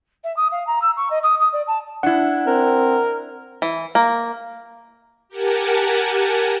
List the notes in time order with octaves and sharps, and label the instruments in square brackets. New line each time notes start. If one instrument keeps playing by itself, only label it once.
[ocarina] E5
D#6
F5
A#5
E6
C#6
D#5
D#6
D#6
D5
A5
[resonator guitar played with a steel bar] D4 E4 [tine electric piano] F#5
[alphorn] C4 [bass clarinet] A#4
[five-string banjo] E3
A#3
[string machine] G4 A#4 F#5 G#5 A5